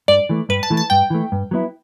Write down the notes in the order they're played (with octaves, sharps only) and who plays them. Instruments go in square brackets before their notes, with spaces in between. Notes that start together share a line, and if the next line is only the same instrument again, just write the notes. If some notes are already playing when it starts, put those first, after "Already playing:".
[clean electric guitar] G2 [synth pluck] D5
[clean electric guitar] E3 A3
[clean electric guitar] G2 [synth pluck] B4
[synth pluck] A5
[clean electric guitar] E3 A3
[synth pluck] A5
[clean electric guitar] G2 [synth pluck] G5
[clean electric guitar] E3 A3
G2
F#3 B3 E4